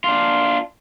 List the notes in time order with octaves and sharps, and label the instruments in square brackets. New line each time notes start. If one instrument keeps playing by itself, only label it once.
[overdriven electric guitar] D4 F4